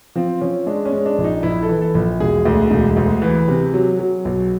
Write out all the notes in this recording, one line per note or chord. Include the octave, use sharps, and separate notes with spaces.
F3 C4
F3 C#4
G#3 D4
C#4
G#3
D4
A#1
D#4
A#1 E4
A4
E3
A4
A#1
E1 G#4
D2
E1
D2
E3
C3
F#3
F#3
B1